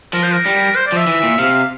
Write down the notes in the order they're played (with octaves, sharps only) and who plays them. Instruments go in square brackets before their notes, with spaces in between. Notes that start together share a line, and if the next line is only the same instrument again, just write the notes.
[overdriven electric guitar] F3 [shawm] A#4
[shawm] C5
A#4
[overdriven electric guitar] G3
[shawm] C5
D5
[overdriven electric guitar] F3 [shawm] E5
[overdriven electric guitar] E3
A#2
[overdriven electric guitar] C3 [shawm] F5